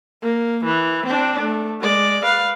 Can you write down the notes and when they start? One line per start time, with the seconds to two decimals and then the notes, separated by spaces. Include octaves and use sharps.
0.22 A#3
0.65 E3
1.07 C4 D4
1.42 A3
1.81 G#3 D5
2.25 B4 F5